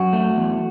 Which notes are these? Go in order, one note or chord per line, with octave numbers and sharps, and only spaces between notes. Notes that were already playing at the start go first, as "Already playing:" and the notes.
Already playing: F#2 F#4
A3
E2